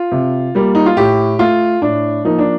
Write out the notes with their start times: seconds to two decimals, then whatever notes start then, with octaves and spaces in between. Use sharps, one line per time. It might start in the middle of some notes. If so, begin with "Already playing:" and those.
Already playing: F4
0.12 C3
0.55 G3 A#3
0.75 D#4
0.86 F4
0.96 A2 G4
1.39 A3 F4
1.82 A2 D4
2.25 F3 A#3 D#4
2.39 D4